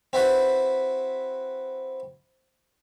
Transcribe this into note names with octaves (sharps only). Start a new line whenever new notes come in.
C4 E4 F#4 B4